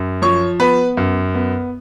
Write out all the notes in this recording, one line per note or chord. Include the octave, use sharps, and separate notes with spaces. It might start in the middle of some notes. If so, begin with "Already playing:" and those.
Already playing: F#2
F3 C#5 C#6
B3 B4 B5
F#2
B3